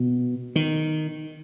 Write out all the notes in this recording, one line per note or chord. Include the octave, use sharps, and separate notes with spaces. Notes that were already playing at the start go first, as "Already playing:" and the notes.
Already playing: B2
D#3